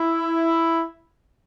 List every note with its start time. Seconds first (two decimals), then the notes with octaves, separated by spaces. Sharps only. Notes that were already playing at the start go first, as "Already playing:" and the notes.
Already playing: E4